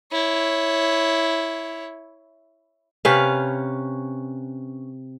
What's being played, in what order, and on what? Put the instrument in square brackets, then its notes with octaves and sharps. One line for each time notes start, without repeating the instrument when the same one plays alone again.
[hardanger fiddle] E4 C#5
[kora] C3 C#4 B4 F5